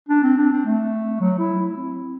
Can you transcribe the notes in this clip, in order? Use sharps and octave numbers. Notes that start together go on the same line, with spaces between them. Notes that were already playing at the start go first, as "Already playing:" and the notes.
D4
C4
D4
C4
A3
F#3
E4
E4
C4